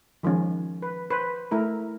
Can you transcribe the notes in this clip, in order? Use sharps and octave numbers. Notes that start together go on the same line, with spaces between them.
D#3 F3 G#3 C#4
B4
B4 C5
A3 E4 A#4